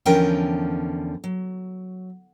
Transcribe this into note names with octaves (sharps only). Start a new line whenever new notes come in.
E2 D3 F3 C#4 A#4 G5
F#3